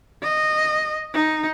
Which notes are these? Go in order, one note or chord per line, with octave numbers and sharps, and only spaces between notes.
D#5
D#4